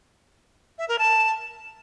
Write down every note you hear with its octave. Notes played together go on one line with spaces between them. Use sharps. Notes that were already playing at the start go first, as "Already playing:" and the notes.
E5
A#4
A5